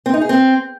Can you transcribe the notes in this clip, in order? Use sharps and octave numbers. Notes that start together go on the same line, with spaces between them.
C4
D#4
G#4
C4